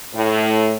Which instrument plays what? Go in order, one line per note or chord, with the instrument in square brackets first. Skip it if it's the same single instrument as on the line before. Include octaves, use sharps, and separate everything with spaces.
[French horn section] A2